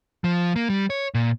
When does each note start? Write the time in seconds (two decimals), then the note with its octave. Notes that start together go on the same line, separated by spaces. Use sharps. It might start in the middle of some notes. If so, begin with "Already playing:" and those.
0.24 F3
0.56 A#3
0.70 G3
0.90 C#5
1.14 A#2